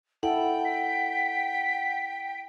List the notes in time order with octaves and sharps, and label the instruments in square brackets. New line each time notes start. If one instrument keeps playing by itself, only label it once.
[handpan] E4 A4 [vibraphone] F#5 [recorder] G5
[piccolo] B6